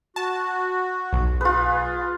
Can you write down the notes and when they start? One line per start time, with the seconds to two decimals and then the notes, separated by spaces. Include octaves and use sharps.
0.16 F#4 A5
1.13 B1
1.41 F4 G#4 B4